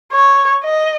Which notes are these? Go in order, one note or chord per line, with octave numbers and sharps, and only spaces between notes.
C#5
D#5